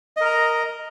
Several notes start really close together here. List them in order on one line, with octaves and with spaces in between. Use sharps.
D#5 A#4 A#5